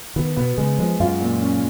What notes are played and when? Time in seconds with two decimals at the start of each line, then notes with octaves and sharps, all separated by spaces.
0.16 D#3 B3
0.37 B2 B3
0.58 C#3 G#3
0.79 F3 G#3
1.00 F#2 F4
1.20 A#2
1.42 C#4